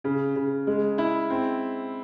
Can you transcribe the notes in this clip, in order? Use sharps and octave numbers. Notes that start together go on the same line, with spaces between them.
C#3
C#3
G#3
E4
C4